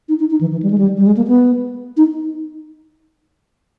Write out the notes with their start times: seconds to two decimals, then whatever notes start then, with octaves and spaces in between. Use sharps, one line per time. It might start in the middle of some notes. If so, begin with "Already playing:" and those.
0.09 D#4
0.19 D#4
0.30 D#4
0.41 E3
0.52 E3
0.63 G3
0.70 G#3
0.78 G3
0.97 G3
1.06 G#3
1.17 A#3
1.28 B3
1.97 D#4